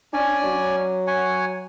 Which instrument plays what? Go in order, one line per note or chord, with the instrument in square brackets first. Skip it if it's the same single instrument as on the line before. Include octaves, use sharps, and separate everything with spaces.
[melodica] C#4 D5 G#5 [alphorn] D4
[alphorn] F#3
[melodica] C#5 F#5 G#5